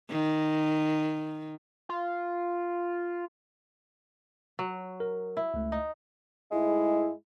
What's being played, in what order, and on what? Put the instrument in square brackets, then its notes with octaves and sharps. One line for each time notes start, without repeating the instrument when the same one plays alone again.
[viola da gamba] D#3
[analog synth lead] F4
[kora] F#3
[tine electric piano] A#4
[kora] E4
[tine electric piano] C#2 A3
[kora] D#4
[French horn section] G#2 A3 E4 [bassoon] G#3